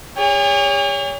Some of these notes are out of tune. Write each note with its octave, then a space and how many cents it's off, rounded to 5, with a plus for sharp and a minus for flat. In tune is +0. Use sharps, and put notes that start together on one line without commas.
G#4 -45 C#5 +30